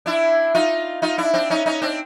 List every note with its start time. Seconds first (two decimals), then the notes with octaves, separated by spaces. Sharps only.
0.06 D4 E4
0.55 D#4 F4
1.02 D#4 F4
1.18 D4 E4
1.34 C4 D4
1.50 C#4 D#4
1.66 C#4 D#4
1.82 C4 D4